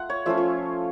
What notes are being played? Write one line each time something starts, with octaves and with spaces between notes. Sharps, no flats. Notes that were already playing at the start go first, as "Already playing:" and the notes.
Already playing: A3 F4 F#5
C#5
F3 A3 C#4 F4 E5
C#5